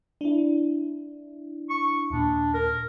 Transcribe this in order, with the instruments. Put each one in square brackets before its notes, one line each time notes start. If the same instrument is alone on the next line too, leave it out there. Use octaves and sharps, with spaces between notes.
[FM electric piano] D4 E4
[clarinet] C#6
[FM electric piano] D#2 A#2 [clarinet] D4
[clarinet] A#4